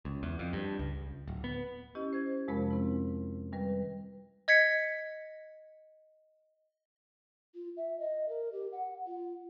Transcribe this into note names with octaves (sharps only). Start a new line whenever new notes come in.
C#2
E2
F2
G2
C#2
D1
B3
C#4 E4 G4 D#5
C5 G#6
F2 C3 F3 G#3 A#4 B5
C4 E4
D#3 G3 B4
D#5 G#6 B6 C#7
F4
E5
D#5
A#4
G4
F#5
F4